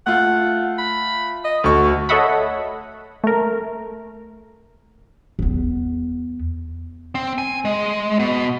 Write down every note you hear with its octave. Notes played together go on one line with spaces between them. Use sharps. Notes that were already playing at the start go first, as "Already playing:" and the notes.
A3 F4 F#5
B5
D#5
D2 F#4 A4 C#6
A4 C#5 D#5 E5 F#5 B5
A3 A#4
E2 B3
C4
G#5
G#3
B2